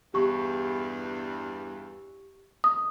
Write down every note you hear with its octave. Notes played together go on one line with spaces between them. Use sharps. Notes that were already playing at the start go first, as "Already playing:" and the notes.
E2 G2 G4 C#6
D#6